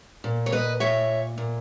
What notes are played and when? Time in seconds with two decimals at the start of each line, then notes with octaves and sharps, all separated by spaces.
0.24 A#2
0.46 C#5
0.52 B4 D#5
0.80 A#2 C#5 E5
1.38 A#2